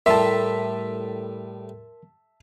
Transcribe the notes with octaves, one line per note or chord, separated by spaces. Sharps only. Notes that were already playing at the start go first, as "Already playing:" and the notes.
A2 G3 A#4 E5 A5 C6